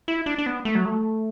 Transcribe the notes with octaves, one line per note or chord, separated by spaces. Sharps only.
E4
D4
D4
B3
A3
F#3
A3